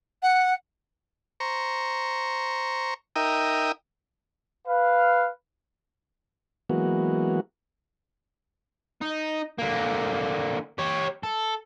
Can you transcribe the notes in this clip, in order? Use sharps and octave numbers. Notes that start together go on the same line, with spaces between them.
F#5
C5 A#5 C#6
D#4 A#4 E5 G5 D#6
B4 F5
E3 F#3 G#3 A#3 B3 F#4
D#4
D3 A#3
G4 C#5
A4